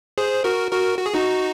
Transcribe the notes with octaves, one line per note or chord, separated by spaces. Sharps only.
G#4 C5
F#4 A#4
F#4 A#4
F#4
G#4
D#4 F#4